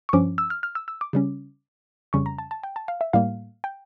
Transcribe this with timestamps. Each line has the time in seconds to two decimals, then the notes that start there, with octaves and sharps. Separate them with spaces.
0.09 C#6
0.13 G2 F3 C#4 D6
0.38 E6
0.50 F6
0.63 F6
0.75 E6
0.88 E6
1.01 D6
1.13 C#3 G3 C#4
2.13 F2 C#3 G3 C#4 C#6
2.26 A#5
2.38 A5
2.51 A5
2.64 G5
2.76 A5
2.88 F5
3.01 E5
3.13 A2 G3 A#3 F5
3.64 G5